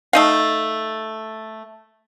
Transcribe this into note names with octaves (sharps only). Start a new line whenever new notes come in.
A3 D#4 F5